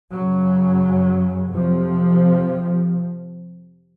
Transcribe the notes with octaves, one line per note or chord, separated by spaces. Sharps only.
F#2 C#3 F#3
F2 C3 F3